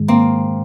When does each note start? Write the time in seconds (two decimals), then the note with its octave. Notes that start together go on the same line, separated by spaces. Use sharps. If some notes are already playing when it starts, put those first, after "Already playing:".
Already playing: G#2 D#3 G#3
0.08 A#3 C4